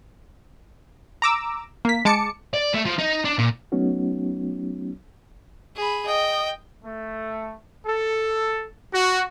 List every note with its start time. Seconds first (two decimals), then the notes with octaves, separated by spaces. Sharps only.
1.22 A#5 D6 E6
1.85 A#3 B6
2.05 G#3 A5 D6 C#7
2.54 D5
2.74 A3
2.86 F3
2.99 D#4
3.25 D4
3.38 A#2
3.72 F#3 A3 B3 C#4 D#4 F#4
5.76 G#4 B5
6.07 D#5 G5
6.85 A3
7.86 A4
8.93 F#4